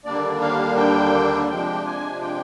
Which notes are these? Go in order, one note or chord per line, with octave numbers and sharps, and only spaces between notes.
D#2 D3 G3 A#3 D4 D5
F5
G5
C3 F3 G#3 D4 G5
G#5
G5